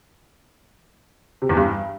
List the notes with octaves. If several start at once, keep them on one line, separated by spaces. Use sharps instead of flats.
C3
E2
G2